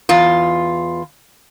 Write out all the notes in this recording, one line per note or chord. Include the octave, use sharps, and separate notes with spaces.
E2 F4